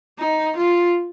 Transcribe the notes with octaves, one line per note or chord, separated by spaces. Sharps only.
D#4
F4